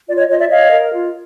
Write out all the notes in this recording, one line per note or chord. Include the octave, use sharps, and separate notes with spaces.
F4 D5
C#5 D#5
F4 C#5 D#5
D5 E5
C#5 D#5 F5
A#4
F4